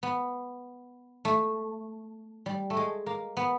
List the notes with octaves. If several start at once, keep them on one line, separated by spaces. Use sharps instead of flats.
B3
A3
G3
A3
G#3
A#3
B3